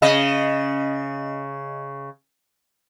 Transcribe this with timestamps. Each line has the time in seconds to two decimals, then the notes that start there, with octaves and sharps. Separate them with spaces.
0.02 C#3 D#5